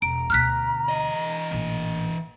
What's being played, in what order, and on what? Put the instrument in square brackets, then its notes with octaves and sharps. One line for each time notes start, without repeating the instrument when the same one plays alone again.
[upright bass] E1 [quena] A#5 [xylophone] D7
[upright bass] D2 B2 [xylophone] F6 F#6 B6
[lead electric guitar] E3 D#5
[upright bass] A1 A#2